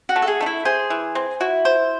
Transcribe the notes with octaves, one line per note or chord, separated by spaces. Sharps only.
F#4
A3
A4
G#4
A3 D#4
E4
G#4 C5
E3
C4
E4 F#4
C5